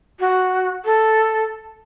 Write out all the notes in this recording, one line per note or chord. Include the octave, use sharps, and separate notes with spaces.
F#4
A4